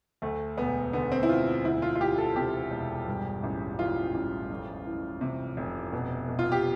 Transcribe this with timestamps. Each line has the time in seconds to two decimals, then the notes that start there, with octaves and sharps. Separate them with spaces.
0.22 D2 A3
0.57 E1 B3
0.93 D3 B3
1.12 C4
1.23 E4
1.29 E1 F4
1.65 D2 E4
1.82 F4
1.95 F4
2.01 E3 G4
2.18 A4
2.36 C3 G4
2.71 E1
3.07 G2
3.43 A1
3.79 E3 F4
4.14 A1
4.50 F2
4.86 E3
5.21 C3
5.57 F1
5.93 B2
6.29 B2
6.39 F4
6.52 G4